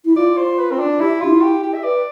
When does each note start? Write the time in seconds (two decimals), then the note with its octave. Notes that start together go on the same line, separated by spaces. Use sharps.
0.05 E4
0.16 F4 D5
0.37 C5
0.58 B4
0.71 C4
0.79 D4
1.00 E4 G4
1.21 D4 F4
1.28 E4
1.41 G4
1.63 G4
1.74 E5
1.83 B4 D5